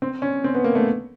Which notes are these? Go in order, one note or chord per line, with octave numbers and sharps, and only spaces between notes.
C4
C#4
C4
B3
A#3
A3